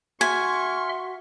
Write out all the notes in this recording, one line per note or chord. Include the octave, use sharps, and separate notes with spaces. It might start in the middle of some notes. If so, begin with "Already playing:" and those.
F#4 E5 G#5 C6 C#6 F6